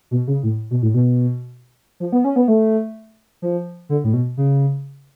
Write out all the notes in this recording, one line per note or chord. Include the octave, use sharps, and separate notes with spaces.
B2
C#3
A2
B2
A2
B2
F3
B3
C#4
B3
A3
F3
D3
A2
B2
C#3